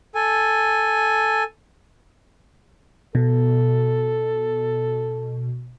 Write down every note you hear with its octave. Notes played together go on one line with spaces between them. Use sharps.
A4 G#5
B2 A4